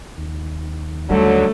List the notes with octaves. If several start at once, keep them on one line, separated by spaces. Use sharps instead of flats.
D#2
D3 F#3 G3 A3